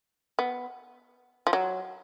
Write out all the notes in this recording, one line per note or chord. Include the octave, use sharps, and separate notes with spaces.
B3
F3
F#3